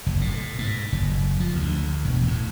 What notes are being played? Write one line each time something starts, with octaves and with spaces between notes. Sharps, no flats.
F#1
A2
G#2
F#1
F3
D2
E1
A2